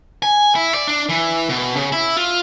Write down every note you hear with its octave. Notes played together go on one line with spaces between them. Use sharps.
G#5
E4
D5
D4
E3
B2
C#3
E4
F4